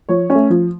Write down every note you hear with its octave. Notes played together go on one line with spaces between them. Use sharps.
F3 C#5
A3 C#4
F3